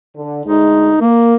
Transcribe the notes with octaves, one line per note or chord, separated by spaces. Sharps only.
D3
D2 G#3 D#4
A#3 A#4